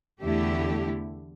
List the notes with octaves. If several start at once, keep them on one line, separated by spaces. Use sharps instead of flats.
E2 D3 A3 E4 G4